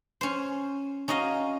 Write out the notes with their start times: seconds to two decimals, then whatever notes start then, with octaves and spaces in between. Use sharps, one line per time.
0.21 C#4 C5
1.08 C#4 D#4 F#4 D#5 F5